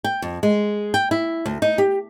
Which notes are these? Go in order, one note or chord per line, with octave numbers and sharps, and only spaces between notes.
G5
F2
G#3
G5
E4
D2
D#4
G4